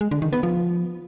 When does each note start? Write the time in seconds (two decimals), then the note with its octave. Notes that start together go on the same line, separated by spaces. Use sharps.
0.01 G#3
0.11 D3
0.22 D#3
0.33 B3
0.43 F3